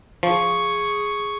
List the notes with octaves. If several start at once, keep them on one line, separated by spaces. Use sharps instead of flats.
F3 G#4 C#6